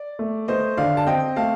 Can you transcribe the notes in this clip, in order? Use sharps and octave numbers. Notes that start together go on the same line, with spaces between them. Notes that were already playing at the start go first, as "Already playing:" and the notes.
Already playing: D5
A3
A3 C5 D#5
D3 D5 F5
A5
C4 D#5 G5
A3 F5 A5